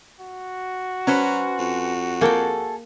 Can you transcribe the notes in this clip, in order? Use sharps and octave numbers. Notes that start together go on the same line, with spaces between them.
F#4
F#3 C#4 B4 C5
F2
A#3 G#4 A4 G5